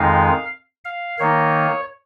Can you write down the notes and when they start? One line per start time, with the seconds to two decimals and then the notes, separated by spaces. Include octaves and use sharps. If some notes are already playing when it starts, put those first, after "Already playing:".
Already playing: F2 D#3 G#3 D#4 F5
0.85 F5
1.19 D#3 A#3 D#4 C#5